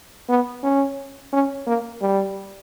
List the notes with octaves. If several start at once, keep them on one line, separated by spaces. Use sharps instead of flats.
B3
C#4
C#4
A#3
G3